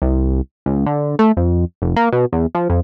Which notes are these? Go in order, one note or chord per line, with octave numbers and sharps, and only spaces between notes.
C2
C#2
D3
A3
F2
F1
A#3
B2
E2
F3
F2